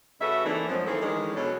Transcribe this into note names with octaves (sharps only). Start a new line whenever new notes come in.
C#3 A3 F#4 B4 E5
E3 A3 A#3 C4 D4 D#4
F#2 F3 F#3 G#3 C4
D#3 E3 A3 G#4 A4 C5
D#3 E3 G#3 C#4 D4
B2 F#3 C#4 A4